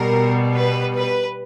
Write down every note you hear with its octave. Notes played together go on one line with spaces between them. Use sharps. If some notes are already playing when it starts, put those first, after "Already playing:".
Already playing: B2 G3 A#4
B4
B4